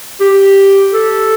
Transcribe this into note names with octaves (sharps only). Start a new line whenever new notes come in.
G4
A4